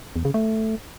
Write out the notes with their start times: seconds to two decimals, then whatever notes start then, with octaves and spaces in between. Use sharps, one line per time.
0.16 E2
0.25 C#3
0.34 A3